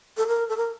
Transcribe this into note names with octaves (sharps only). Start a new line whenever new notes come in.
A4
A#4
A4
A#4